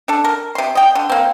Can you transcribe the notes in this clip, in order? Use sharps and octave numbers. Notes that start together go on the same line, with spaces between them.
D4 A4
A#4
C3 C6
D#5 G5
D3
A#3 C4